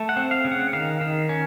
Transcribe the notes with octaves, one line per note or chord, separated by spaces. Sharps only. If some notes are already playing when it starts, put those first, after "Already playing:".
Already playing: A3
F#5
C4
F5
C#3
F#5
D#3 F5
D#3
C#4